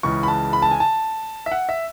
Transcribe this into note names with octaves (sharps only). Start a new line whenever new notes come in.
C#2 C#3 E3 C#6
B5
A5
B5
A5
G#5
A5
E5
F#5
E5